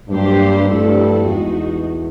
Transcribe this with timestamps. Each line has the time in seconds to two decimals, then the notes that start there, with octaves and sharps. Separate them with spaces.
0.09 G2 F#3 A#3 D4 G4 C5
0.67 G2 F3 A3 C4 E4 A4
1.24 E2 G#3 B3 D#4 F#4